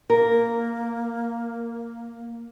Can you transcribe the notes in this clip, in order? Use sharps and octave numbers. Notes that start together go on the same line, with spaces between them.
A#3 A#4